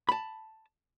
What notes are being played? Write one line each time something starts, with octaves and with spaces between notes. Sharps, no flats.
A5 B5